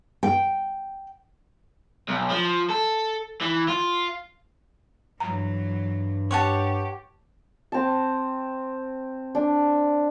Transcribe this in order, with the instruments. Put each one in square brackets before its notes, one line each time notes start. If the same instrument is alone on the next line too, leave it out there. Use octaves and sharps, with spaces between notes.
[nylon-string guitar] G5
[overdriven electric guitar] B1
F3
A4
E3
F4
[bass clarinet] G2 [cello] E3 F#3 [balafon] A#5
[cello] G4 [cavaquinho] C#5 F#5 A5
[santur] C4 A5
D4